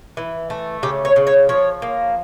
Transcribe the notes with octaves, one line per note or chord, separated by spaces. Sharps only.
E3
A3
C#3 G4
C#5
C#3
C#5
F3 C#5
A#3